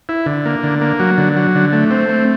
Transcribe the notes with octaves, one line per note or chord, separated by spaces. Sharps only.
E4
D3
A#3
D3
A#3
F#3
D3
F#3
D3
A3
C4
A3